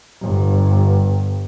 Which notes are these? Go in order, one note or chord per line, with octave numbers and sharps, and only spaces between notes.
G1 G2